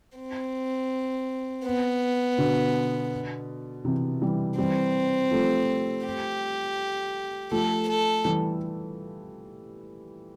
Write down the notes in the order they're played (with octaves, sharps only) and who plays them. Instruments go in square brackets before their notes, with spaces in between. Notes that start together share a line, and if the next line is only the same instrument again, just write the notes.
[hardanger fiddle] C4
B3
[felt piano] B2 D3
C3 E3
E3 G3
[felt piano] E3 G3 [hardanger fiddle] C4
[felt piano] F3 A3
[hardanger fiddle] G4
[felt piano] F3 A3 [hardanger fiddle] A4
[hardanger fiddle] A4
[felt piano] E3 G3